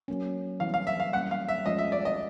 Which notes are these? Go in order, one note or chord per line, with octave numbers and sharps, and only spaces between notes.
F#3 A#3 C#4
E3 G3 B3 F5
F5
E5
F5
G3 A#3 C#4 F#5
F5
E5
F3 G#3 C#4 D#5
E5
D5
D#5